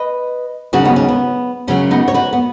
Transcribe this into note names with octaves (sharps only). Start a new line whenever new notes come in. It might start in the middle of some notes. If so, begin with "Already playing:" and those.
Already playing: B4 D#5
D#2 C#3 F#3 C#4 F#4
B3 D#4
C#4
B3
F#2 C#3 F#3 C#4
B3 D#4
C#5
F#4 B4
B3